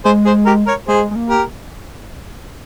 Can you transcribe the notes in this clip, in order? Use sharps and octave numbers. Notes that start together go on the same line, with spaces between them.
G#3 G#4 C5
G#4 C5
G4 A#4
A#4 C#5
G#3 G#4 C5
G#3
A#3
G4 A#4